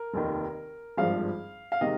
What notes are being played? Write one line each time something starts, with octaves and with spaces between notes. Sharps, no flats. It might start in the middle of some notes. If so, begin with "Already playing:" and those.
Already playing: A#4
F1 D#2 D#3
G#1 G2 F3 G#3 F5
F5
C3 D#3 G#3 D#5